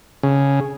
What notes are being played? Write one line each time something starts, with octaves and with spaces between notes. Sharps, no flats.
C#3